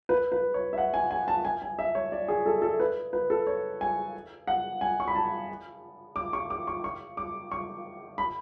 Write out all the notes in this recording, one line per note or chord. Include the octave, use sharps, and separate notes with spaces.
B4
B4
C#5
E5
F#5
G#5
G#5
A5
G#5
G#5
E5
C#5
D5
G#4
A4
A4
B4
B4
A4
C#5
G#5
F#5
G#5
C#6
B5
A5
D6
C#6
D6
C#6
C#6
D6
C#6
B5